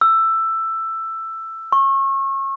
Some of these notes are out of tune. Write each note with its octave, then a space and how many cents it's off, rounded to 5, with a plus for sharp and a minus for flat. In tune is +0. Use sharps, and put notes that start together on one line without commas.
E6 +10
C#6 -30